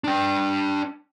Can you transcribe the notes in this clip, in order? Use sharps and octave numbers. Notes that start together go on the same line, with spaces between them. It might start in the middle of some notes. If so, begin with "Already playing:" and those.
D4 G5